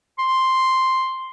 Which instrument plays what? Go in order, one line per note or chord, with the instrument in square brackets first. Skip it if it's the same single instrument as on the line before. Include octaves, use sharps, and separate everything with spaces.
[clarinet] C6